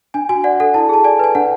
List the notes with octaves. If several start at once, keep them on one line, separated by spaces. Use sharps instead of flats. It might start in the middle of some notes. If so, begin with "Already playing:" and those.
D4 G#5
F#4 G#5
D5 F#5
A4 F#5
E4 A5
G#4 A5
D5 G#5
B4 G#5
D4 F#5